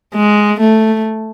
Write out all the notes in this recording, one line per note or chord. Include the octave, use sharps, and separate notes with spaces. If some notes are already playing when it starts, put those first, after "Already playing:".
G#3
A3